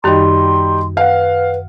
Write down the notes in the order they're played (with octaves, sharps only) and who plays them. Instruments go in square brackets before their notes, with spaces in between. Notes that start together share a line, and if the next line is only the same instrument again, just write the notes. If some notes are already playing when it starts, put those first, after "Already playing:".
[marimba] F#2 D#3 [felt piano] G3 D#4 G4 [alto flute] C6
[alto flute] B4 [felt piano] F5 F#5